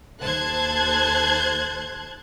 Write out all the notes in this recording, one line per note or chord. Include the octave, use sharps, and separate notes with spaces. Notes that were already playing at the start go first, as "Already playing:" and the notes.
D#2 A4 C5 A5 F#6 G#6